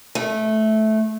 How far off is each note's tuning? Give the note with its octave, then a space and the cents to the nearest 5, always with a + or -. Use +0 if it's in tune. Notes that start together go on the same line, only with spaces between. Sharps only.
A3 -15